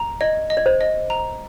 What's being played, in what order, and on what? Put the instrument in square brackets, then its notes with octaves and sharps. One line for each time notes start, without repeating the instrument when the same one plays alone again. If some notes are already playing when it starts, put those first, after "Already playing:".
Already playing: [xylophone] A#5
[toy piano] D5 [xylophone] D#5
[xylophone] D#5
[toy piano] D5
C5
[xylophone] D#5
A#5